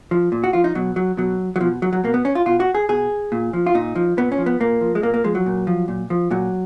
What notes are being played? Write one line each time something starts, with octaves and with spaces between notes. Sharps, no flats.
F3
A#2
F#4
F3 F4
D#4
B2 F#3
F#3
B2 F#3
F#3
B2 F3
F#3
F#3
B2 A#3
B3
C#4
F4
B2 F4
F#4
G#4
B2 G#4
A#2
F3
F4
A#2 D#4
F3
A#2 B3
C#4
F3
B3
A#2 A#3
F3
G#3
A#2 A#3
A#3
F3 G#3
F#3
A#2
F3
A#2
F3
A#2 F#3